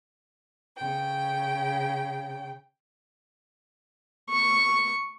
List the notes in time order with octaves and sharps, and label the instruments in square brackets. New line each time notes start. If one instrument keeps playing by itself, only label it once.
[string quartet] C#3 G5
[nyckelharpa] C#6